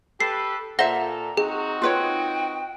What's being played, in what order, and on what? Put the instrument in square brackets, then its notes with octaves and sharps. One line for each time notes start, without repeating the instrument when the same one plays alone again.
[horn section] G4 A4 B4 [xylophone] C7
[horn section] A#2 A4 [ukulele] C5 E5 [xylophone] F#5 A#6 G7 [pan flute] A#5
[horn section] C4 D#4 F#4 [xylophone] G#4
[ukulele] F4 B4 C#5 [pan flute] G5